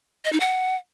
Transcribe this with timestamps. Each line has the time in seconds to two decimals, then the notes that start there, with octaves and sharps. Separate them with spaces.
0.25 D#5
0.32 D#4
0.40 F#5